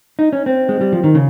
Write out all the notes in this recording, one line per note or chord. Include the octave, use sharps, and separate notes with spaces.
D#4
C#4
C4
G#3
G3
F3
D#3
C#3